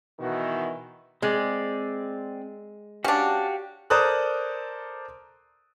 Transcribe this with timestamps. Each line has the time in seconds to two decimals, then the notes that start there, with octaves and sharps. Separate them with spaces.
0.20 B2 D#3 E3 E4 F#4
1.22 G#3 C4 D5
3.04 C#4 D4 F#4 G4 F5
3.90 A4 A#4 C5 D5 D#6 F#6